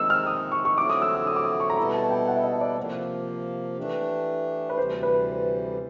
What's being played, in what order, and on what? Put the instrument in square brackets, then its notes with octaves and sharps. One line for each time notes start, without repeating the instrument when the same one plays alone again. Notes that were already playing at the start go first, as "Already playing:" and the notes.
Already playing: [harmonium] D#3 G#3 C4 D#4 [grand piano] E6
[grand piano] F6
D#6
C#6
C#6
[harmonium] D3 F#3 A3 C4 E4 [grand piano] D6
[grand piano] D#6
E6
E6
D#6
D6
D#6
C#6
A#5
[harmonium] B2 G3 B3 E4 A4 [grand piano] B5
[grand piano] A5
G5
F#5
E5
D#5
D5
[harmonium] C3 F3 A#3 [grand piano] C5
[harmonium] E3 A3 D4 G4
[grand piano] B4
[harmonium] D2 C3 E3 G3 [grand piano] C5
[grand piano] B4